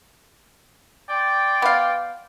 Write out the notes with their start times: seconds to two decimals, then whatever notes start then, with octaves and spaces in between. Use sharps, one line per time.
1.09 D5 G5 C6
1.62 B3 F5